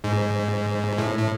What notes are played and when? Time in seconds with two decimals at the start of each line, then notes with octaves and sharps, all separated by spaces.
0.04 G#2
0.98 A2
1.19 A2